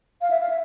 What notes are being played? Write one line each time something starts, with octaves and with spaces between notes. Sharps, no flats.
F5
E5
F5
E5